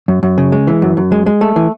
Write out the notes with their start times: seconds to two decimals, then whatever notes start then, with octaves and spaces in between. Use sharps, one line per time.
0.08 F#2
0.23 F#2
0.38 C#3
0.52 G#3
0.67 E3
0.82 F#2
0.97 F#2
1.12 G#3
1.26 G#3
1.41 A3
1.56 E3